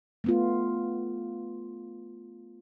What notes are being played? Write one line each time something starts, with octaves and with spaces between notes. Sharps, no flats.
A3 B3 F4